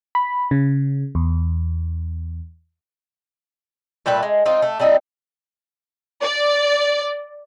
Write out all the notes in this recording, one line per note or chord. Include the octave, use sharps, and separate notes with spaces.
B5
C#3
E2
A#2 G3 A3 B4
G#3
C4 D#4 F4
A3
G3 C4 D#4 E4
D5